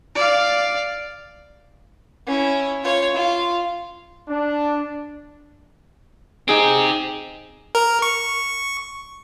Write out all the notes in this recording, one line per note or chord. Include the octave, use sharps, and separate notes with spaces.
D5 F5
C#4 E4
F4 C#5
F4
D4
C4 D#4 G4 G#4 D7
A#4
C#6